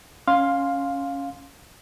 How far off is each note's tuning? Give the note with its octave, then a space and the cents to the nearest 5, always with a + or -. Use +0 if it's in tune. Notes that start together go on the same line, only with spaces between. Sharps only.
C#4 +0 F5 +10 C6 +5